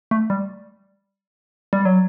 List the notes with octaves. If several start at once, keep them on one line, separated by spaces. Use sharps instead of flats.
A3
G3
G3
F#3